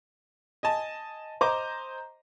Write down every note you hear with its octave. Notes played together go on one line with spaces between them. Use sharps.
D#5 G#5 A5
C5 D#5 A#5 D6